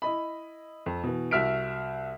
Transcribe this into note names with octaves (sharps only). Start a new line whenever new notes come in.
E4 D#5 B5
F2
B2 E3
C2 F#4 E5 F6 B6 D7